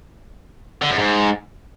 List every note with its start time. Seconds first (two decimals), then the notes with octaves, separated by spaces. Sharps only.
0.82 D3
0.90 F#2
0.98 G#2